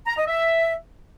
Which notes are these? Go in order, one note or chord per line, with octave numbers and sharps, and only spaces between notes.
A#5
D#5
E5